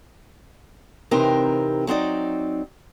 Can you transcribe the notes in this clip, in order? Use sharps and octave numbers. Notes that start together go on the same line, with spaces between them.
C3 E3 C4 D#4 G4 A#4
F#3 C4 D#4 D5